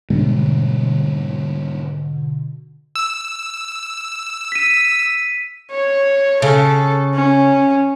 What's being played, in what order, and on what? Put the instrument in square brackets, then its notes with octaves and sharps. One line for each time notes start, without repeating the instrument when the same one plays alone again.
[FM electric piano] G#2 B2 D3 [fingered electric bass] D#3 G3 A3
[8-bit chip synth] E6
[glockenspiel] B6 D#7
[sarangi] C#5
[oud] C#3 [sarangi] A4
[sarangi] C#4